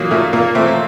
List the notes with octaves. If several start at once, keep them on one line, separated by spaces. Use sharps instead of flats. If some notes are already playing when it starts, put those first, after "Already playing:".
Already playing: A#2 F#3 A#3 D#4
A#2 A3
A#2 A#3
A#2 A3 C4
A3